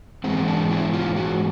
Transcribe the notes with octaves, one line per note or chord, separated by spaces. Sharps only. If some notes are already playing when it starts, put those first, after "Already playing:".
G#2 E3 G#3 B3 C4
D4
E4
F4
F#4